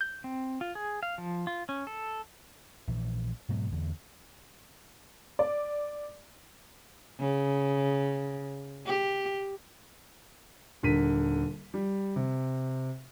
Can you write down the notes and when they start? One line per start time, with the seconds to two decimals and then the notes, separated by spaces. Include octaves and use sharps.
0.01 G6
0.24 C4
0.61 F4
0.75 G#4
1.03 F5
1.18 F3
1.47 F4
1.69 C#4
1.87 A4
2.88 A#1 E3
3.49 G#2 B2 F#3 G#3
3.72 E2 D3
5.39 D5
7.19 C#3
8.86 G4
10.83 D#1 D3 A#4 B6 D#7
11.74 G3
12.16 C3